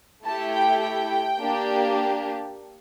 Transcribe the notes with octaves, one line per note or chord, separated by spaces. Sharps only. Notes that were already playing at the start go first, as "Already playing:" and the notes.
A3 E4 G4 A5
G5
G5
A#3 D4 G4